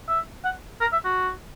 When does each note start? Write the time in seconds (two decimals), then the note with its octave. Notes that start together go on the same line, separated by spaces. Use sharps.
0.08 E5
0.45 F#5
0.81 A#4
0.93 E5
1.05 F#4